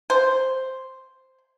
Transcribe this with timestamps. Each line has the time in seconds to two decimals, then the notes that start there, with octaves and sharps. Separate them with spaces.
0.10 C5